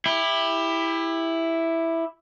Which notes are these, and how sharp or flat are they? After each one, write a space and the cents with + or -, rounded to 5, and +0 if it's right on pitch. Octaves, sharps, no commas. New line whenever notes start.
E4 +0 G4 +25